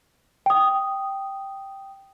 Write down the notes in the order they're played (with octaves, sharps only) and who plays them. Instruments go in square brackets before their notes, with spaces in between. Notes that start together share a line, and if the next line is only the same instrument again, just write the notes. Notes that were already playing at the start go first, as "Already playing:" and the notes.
[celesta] G5 D#6